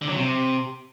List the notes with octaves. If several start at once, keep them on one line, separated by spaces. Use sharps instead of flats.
D3
F#3
C3